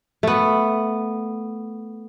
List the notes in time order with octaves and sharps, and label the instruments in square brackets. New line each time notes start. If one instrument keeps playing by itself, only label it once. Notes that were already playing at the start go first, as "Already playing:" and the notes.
[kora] A3 B3